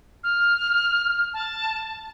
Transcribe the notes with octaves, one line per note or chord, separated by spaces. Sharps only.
F6
A5